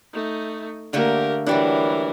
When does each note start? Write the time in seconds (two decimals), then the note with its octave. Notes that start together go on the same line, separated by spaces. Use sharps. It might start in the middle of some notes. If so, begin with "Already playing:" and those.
0.13 A3 D#4
0.93 D3 A3 A#3 G4 A#4
1.47 E3 F#3 G3 D4 A#4